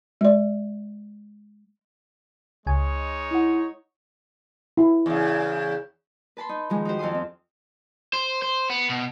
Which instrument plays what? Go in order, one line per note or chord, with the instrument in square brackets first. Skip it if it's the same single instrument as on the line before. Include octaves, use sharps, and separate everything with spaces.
[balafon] G#3 D5
[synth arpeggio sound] C#2 G#5 [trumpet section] G#3 D#4 C#5
[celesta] E4 F#5
[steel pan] E4
[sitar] E2 C#3
[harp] B4 A5 B5 C6
D#4
D#3 F3 G#3
D#4 F#4 G4 C5
F2 A4 F5 C6 D#6
C4 F4
[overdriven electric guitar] C5
C5
B3
B2